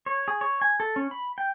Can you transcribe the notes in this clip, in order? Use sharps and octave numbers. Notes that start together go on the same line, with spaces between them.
C#5
G#4
C#5
G#5
A4
C#4
B5
G5